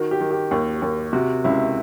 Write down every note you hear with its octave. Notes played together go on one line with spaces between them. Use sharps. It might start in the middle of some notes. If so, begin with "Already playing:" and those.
Already playing: D#3 F#4
G4
D#3
G4
D#2
D#2
C3 F#4
C#2 E4